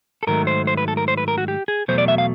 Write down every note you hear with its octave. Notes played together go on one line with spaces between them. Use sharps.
A4
G#2 D#3 F#3 A3 A#4
C5
C5
B4
A4
A#4
C5
B4
A#4
F#4
G4
G#4
E2 B2 F#3 A3 C5
D5
E5
F5